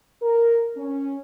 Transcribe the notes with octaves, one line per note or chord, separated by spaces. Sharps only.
A#4
C#4